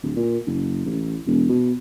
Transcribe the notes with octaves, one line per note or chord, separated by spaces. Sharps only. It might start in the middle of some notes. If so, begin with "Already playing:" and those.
D1
A#2
F#1
A1
E1
B2